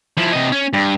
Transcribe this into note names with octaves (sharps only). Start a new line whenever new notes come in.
F3 E4
C3 D#5
C#4
G2